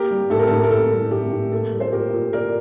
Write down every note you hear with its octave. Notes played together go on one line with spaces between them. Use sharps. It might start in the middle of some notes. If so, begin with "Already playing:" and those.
Already playing: A#3 G4 A#4
G3
A2 A4
A#4
A2 A4
A#4
A#3 A4
G3
A2 G4
A2
A#3 A4
G3
C5
A#2 G4 A#4
A#2
A#3 A#4 D5